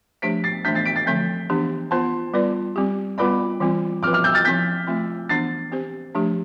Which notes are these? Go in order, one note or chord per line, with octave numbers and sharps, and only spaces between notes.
F3 A3 D4 G4 C5 B6 D7
A6 C7
E3 A3 D4 G6 B6
A6 C7
B6 D7
A6 C7
D3 F3 A3 C4 G6 B6
E3 B3 D4 G4
B3 F4 C5 A5 C6
G3 B3 F4 B4 D5
G3 C4 G4
G3 B3 F4 B4 D5 B5 D6
E3 G3 C4 F4
F3 C4 F4 B4 D6 F6
D6 F6
E6 G6
F6 A6
F3 C4 E4 G6 B6
F3 A3 C4 F4
E3 B3 D4 A6 C7
C4 G4 C5
F3 A3 D4 G4